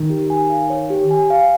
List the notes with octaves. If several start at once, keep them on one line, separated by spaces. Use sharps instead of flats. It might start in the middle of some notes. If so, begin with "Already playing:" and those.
Already playing: D#3
G4
G#5
F5
C#5
G4
G#5
F5